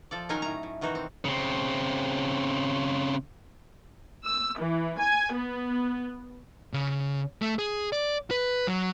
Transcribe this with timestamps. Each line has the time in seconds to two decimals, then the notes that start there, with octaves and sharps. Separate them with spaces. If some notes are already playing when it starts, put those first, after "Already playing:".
0.11 F3 A4 D5
0.29 D#3 F#3 C#4 D#4 A#4 G#5
0.42 A2 A#5
0.63 A2
0.81 B2 D#3 E3 D#4 F#4
0.95 C4
1.25 C#3 C4
4.26 E6
4.59 E3
5.00 G#5
5.35 B3
6.73 C#3
7.42 A3
7.59 G#4
7.93 D5
8.31 B4
8.67 F#3